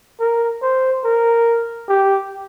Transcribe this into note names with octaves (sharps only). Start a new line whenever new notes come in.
A#4
C5
A#4
G4